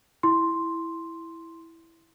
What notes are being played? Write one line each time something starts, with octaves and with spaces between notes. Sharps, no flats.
E4 C6